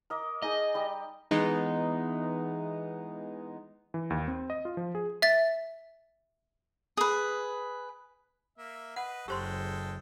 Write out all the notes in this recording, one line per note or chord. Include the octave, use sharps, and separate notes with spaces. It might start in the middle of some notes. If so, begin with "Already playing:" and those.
A#4 D#5 D6
D#4 G#4 D#5 A5
G3 G4 D#6
E3 G#3 B3 D#4
E3
D#2
C4
D#5
F4
F3
G#4
E5 A6
G#4 B4
A#3 E5
B4 D#5 F#5
F#1 G#3 G4 A4 C5 G5 C6